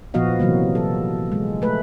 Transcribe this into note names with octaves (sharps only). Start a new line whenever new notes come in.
A#2 F3 B3 F#4 D#5 F5
C3 E3 F#3 A#3
A4
G#3
A3 B4